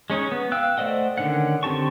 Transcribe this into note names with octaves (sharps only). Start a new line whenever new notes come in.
G#3 C#4 D#4 C#5
B3
F5 G5 E6 F#6
A3 C5 D5 D#5 F#5
D3 D#3 C#4 F#5
D3 C4 G4 A5 C#6